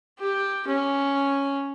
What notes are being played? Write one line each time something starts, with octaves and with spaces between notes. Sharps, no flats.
G4
C#4